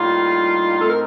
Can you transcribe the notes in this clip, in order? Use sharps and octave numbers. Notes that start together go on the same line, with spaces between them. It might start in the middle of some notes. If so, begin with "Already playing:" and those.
Already playing: A2 G3 A#3 D#4 F4
A2 A3 C4 D#4 A4
A#4